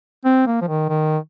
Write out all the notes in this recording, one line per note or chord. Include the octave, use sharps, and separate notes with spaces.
C4
A#3
F3
D#3
D#3